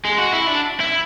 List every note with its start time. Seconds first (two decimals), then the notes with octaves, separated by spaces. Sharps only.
0.05 G#3
0.18 F#4
0.33 E4
0.47 D4
0.80 E4